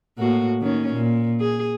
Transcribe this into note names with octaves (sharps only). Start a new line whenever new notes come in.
A2 A#3 F#4
D#3 A#3 C#4
A#2
G#4